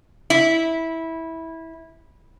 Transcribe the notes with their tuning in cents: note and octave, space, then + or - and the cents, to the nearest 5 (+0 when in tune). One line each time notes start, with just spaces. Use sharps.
E4 -15